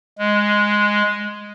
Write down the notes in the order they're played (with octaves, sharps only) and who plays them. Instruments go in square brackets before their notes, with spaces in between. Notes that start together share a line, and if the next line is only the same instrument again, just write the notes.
[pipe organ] G#3